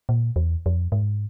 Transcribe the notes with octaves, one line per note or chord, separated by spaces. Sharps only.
A#2
E2
F2
G#2